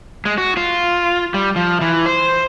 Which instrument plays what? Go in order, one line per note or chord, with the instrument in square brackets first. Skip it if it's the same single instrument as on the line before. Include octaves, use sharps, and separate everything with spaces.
[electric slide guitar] G#3
F#4
F4
G3
F3
E3
C5